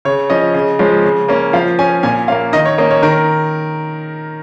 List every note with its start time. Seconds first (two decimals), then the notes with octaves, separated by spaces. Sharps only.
0.05 C#3 C#5
0.30 F3 C#4 D#5
0.54 C#3
0.79 F3 G#3 C#4
1.05 C#3
1.28 A#3 C#4
1.53 F3 F5
1.79 C#4 G#5
2.03 A#2 G#5
2.28 A#3 C#4 F5
2.53 D#3 D#5
2.65 C#5
2.78 A#3 C#4 D#5
2.90 C#5
3.02 D#3 A#4